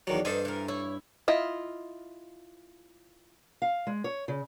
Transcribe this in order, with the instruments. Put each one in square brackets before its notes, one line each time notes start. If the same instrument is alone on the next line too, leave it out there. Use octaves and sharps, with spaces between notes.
[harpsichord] E2 D#3 F#3 [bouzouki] D4
[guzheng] G2 [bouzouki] D#4 [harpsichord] A4 C5 G#5
[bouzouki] E3 A#4
[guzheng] E4 [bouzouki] C#5
[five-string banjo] E4 F4 D#5
[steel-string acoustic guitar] F5
G#3
C#5
C#3